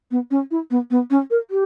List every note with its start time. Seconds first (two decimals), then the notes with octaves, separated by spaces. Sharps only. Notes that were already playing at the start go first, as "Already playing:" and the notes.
0.11 B3
0.31 C#4
0.51 E4
0.71 B3
0.91 B3
1.10 C#4
1.31 A#4
1.51 G4